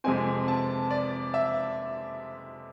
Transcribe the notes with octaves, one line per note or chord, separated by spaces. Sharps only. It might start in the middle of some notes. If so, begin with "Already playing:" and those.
F2 C3 G#3 C4 G#5
A5
D5
E5